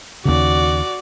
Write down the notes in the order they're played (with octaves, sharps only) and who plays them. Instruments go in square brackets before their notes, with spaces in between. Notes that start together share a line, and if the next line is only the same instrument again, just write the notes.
[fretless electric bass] D#2 C#3 [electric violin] F#4 D5